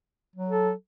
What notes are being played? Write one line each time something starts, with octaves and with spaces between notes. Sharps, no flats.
F#3
A4